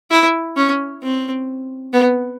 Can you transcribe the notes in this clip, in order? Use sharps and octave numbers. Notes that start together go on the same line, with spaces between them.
E4
C#4
C4
B3